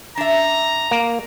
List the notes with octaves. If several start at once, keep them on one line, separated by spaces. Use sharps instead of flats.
D4 E5 A#5
A#3